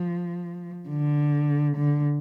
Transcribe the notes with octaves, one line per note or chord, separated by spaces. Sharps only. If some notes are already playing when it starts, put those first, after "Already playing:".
Already playing: F3
D3
D3